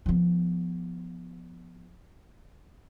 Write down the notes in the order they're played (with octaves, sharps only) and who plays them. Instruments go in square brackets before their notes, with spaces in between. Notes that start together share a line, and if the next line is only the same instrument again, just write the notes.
[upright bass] F3 B3